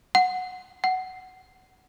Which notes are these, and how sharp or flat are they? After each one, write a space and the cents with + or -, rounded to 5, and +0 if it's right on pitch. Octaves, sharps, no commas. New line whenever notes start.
F#5 -10
F#5 +10